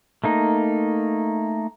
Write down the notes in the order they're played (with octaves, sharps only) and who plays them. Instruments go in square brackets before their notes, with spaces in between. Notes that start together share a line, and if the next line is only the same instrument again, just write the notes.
[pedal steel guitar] A3 A#3 D#4